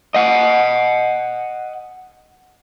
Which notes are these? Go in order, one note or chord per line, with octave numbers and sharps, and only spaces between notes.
D#5 F#5